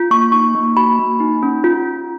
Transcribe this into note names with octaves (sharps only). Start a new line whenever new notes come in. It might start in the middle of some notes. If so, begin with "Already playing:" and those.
Already playing: F4
A#3 C#6
D#4 C#6
A#3
F#4 B5
A#3
D#4
C#4
F4